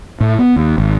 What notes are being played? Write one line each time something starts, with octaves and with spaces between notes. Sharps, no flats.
A2
B3
D#2
G#1